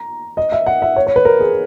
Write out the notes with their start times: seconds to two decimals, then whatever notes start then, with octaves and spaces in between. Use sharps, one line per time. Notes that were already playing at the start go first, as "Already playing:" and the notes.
Already playing: A#5
0.37 D#5
0.52 E5
0.66 F#5
0.82 E5
0.96 C#5
1.07 C#5
1.16 B4
1.25 A#4
1.40 G#4